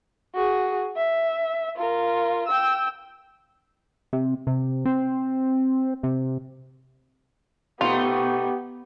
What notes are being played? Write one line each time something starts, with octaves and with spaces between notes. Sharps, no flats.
F#4 G#4
E5
F4 A#4
G5 E6
C3
C3
C4
C3
B2 A3 B3 D#4 F4 G4